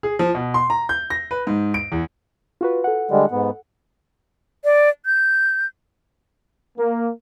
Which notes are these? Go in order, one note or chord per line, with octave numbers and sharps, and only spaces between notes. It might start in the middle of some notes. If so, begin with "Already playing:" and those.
G#4
F3
B2
C6
A#5
G6
A#6
B4
G#2
D7
E2
F4 F#4 B4
A4 F#5
D3 G3 G#3
G#2 B3
D5
G6
A#3